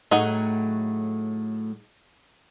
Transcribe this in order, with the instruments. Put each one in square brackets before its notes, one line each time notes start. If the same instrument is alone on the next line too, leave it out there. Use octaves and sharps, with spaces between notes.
[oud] A2 F#3 A3 [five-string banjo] D#4 G#4 F#5